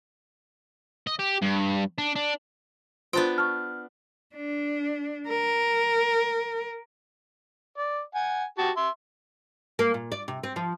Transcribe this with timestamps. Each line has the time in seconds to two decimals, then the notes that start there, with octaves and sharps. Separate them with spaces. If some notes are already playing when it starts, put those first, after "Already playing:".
1.07 D#5
1.19 G4
1.42 G2
1.98 D4
2.16 D4
3.13 B3 D4 F4 C5 G5 C6
3.38 A5 C#6 F6
4.36 D4
5.28 A#4
7.77 D5
8.15 F#5 G#5
8.58 F#4 G4 A5
8.76 E5 C6
9.79 A#3
9.94 A#2
10.12 D5
10.28 C3
10.43 C4
10.56 F3